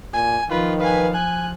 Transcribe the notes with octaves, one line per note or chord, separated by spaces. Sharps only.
A#2 G#5
D#3 F3 F4 B4
B4 F5 G#5
G#5 F#6